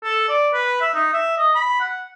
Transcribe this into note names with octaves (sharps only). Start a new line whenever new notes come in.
A4
D5
B4
E5
D#4
E5
D#5
B5
F#5